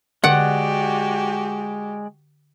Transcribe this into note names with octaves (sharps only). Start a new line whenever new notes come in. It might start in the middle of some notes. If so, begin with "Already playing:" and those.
D3 G#3 F#4 G4 D5 F#5 G5